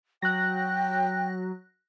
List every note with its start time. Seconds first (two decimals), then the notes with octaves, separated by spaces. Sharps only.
0.22 F#3 G5 F#6 A#6